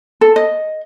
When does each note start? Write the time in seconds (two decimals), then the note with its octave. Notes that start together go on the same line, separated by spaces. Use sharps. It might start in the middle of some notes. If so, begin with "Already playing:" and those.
0.21 A4
0.36 D#5